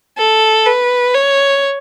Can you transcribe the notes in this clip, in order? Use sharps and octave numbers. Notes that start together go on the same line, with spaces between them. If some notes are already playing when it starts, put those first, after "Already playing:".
A4
B4
C#5